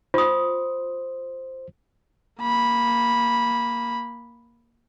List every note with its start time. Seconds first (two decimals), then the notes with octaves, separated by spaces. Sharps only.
0.14 F4 C5 D#6
2.41 A#3 B5